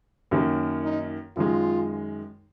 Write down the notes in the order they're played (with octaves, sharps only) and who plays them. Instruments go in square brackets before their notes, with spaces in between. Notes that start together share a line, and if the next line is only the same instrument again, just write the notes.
[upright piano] F#2 D#3 A#3
[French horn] D#4
[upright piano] F#2 D#3 G#3 [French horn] F4